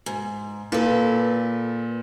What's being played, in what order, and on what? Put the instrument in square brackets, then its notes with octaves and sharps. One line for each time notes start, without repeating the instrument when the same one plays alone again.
[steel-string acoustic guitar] G#2
[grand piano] A#2 [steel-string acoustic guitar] A4 B4